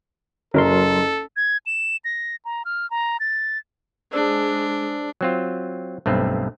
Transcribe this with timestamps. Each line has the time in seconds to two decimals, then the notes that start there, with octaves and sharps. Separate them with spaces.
0.54 F#1 F#3 A4 A#4 A#5 C6
1.36 G#6
1.66 E7
2.05 A#6
2.45 A#5
2.65 F6
2.91 A#5
3.20 A6
4.13 G#3 D4 C5 D5 E6
5.21 F#3 C4 F4
6.06 B1 G2 A3 C4